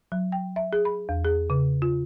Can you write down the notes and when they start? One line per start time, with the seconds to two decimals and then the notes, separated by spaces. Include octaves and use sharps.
0.12 F#3
0.32 G5
0.56 E5
0.73 G#4
0.85 B5
1.09 E2
1.25 G#4
1.50 C#3
1.82 F4